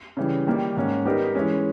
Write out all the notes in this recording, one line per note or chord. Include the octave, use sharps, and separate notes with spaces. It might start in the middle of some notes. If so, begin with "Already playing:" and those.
C#3 E3 G3
D#3 G3 A#3
G#2 D#3 A#3 C#4
G3 B3 D#4 G4 A#4
E3 G#3 C#4